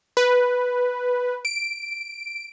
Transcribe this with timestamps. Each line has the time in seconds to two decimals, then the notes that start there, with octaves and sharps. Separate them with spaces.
0.17 B4
1.45 D7